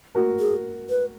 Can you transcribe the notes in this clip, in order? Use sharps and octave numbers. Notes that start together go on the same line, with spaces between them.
F#4 A#4
G#4
B4